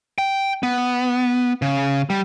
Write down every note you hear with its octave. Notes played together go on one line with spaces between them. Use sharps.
G5
B3
C#3
G3